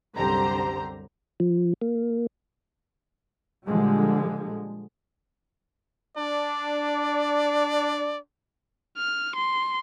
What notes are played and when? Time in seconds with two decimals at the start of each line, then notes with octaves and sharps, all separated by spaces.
0.15 C2 F#2 D3 G4 C5 A#5
1.40 F3
1.81 A#3
3.66 A#2 D3 F3 G3 G#3
6.17 D4 D5
8.98 F6
9.35 C6